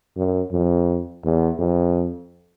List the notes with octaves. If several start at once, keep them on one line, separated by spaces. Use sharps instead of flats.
F#2
F2
E2
F2